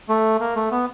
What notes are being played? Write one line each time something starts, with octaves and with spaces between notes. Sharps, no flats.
A3
A#3
A3
B3